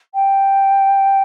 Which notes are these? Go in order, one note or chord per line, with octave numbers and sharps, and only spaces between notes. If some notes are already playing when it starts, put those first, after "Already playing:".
G5